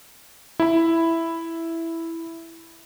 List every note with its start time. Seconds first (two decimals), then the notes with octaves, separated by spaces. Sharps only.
0.60 E4 B5